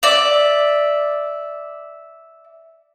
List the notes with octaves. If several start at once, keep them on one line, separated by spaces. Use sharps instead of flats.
D5 E5